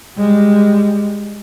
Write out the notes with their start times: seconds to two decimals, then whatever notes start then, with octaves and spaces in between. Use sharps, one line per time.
0.17 G3 G#3